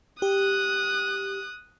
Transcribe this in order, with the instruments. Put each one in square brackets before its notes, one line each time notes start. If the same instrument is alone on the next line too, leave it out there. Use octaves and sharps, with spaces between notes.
[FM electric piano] G4 [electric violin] D#6 F#6